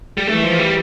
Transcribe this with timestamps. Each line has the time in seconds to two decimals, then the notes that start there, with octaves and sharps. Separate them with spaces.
0.18 G3
0.28 E3 A3
0.44 F3
0.59 G3